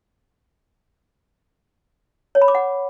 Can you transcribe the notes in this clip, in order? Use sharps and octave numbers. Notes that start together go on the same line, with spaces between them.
C#5
B5
D6
F#5